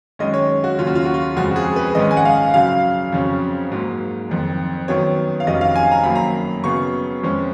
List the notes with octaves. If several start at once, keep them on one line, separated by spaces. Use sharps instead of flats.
F#2 D#3 G#3 C#4 D#5
C#5
F#4
D#2 C#3 F#3 C#4 F4
F#4
F4
F#4
F4
F2 C#3 F3 G#3 F#4
F#4
G#4
B4
A#1 G#2 D#3 G#3 C#4 D#5
G#5
F#5
F5
F#2 C#3 F#3 F5
F2 C#3 F#3 C#4
G#2 F#3 A#3
F#1 F2 D#3
F#2 D#3 F#3 B3 C#5
F5
F1 F2 D#3 F#3 C#4 D#5
F5
G#5
A#5
F#2 D#3 F#3 A#3 B5
A#5
F#2 C#3 F#3 B3 C#6
F2 F3 G#3 C#4